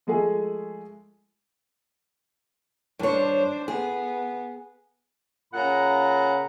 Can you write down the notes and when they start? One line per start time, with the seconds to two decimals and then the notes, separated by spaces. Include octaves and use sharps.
0.07 F3 G#3 A3 G#4
2.99 G2 D4 C5 C#5
3.68 B3 G#4
5.54 A#2 C#3 F#5 A#5 B5